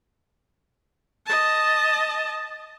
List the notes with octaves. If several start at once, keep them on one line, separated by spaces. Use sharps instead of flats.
D#5 A5